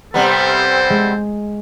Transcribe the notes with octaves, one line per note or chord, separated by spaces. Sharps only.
C3 G3 B3 C4 A4 C5 A#5
G#3